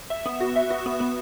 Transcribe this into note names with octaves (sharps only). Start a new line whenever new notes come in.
E5
B3
F#4
E5
F#4
B3
B3